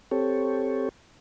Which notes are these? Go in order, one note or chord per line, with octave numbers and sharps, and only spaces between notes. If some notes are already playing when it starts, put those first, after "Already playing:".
C4 G4 A4 C#5